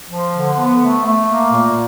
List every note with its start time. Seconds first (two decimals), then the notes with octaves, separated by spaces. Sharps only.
0.10 F3
0.34 D3
0.57 B3
0.81 A3
1.05 A3
1.27 A#3
1.51 A#2